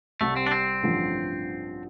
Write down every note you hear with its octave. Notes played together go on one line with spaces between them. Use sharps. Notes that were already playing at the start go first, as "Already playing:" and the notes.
C2 C3 G3 A3
C4
D4
C4
A1 G2 D3 F3